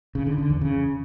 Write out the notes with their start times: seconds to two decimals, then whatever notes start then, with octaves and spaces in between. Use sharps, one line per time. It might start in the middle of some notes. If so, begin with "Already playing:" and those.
0.15 C#3
0.27 D3
0.38 D3
0.50 E2
0.61 C#3